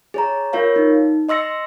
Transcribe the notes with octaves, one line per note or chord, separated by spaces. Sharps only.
G#4 C#5 A#5
F4 A#4 C#5 F5
D#4
D#5 C6 E6 A#6 C#7